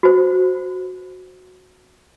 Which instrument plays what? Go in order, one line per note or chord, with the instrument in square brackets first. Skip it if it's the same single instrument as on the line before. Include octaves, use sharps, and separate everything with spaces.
[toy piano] F#4 C5